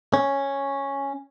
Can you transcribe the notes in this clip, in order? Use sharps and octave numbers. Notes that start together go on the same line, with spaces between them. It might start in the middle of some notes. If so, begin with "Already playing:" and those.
C#4